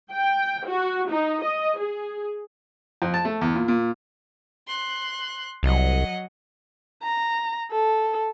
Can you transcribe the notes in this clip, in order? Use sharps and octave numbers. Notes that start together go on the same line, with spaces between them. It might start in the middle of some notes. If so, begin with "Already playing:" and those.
G5
F#4
D#4
D#5
G#4
F2
A5
A3
E2
A#2
A#2
C6 F#6
C2 F#3 D#5 F#5
A#5
A4